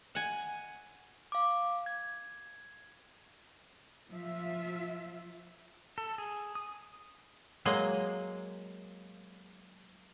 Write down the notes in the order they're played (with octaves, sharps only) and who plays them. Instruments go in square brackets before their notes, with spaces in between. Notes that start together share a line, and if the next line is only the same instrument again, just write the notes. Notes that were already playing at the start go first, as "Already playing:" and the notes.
[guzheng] F#5 G#5
[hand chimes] F5 D6
G#6
[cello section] F3 F4 E5
[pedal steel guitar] A4
G#4
D#6
[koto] F#3 G#3 A#3 D#5